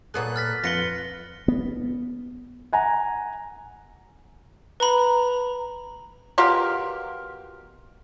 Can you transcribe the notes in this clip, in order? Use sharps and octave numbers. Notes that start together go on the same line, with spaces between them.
A#2 B3 G#4 A4 C#5 D5 F#6
F6 A6 B6
F2 F4 B4 F#6 A#6 C#7 G7
B3
F#5 G#5 A#5
B4 A#5 B5
B2 F4 G4 A#4